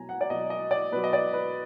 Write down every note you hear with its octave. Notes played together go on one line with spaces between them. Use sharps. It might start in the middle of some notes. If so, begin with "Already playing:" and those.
Already playing: B2 F#3 G#5 A#5
F#5
D5
B2 F#3 D#5
D#5
D5
B2 F#3 B4
D#5
D5
B4